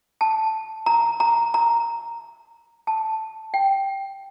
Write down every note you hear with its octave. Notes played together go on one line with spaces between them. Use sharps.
A5
A#5
A#5
A#5
A5
G5